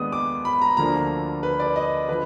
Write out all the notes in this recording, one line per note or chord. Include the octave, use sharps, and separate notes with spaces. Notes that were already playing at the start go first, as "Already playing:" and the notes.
Already playing: D#2 D#3 G#3 B3 D4 D#6
D6
B5
A#5
D2 D3 F3 A#3 D4 A#5
B4
D5
D#5
D3 F3 B4